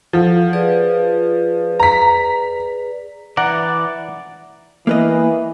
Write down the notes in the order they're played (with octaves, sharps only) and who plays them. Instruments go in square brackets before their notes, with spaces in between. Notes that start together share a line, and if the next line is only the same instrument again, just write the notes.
[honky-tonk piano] F3 [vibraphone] A4 F#5
[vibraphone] G#4 B4 D5
[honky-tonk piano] A#5 B6
[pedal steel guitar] E3 D5 [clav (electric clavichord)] F#5 A#5
[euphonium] E3 [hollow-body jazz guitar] A#3 B4 D#5